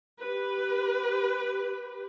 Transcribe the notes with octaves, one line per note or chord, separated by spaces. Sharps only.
G4 B4